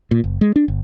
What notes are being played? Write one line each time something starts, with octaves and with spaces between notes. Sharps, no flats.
A#2
F#1
G#3
D4
G1